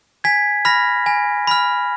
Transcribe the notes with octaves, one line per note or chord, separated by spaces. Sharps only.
G#5 G#6 B6
B5 F6 A#6
G#5
B5 F6